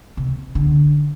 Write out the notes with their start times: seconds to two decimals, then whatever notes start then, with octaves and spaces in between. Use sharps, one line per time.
0.17 C3
0.55 D3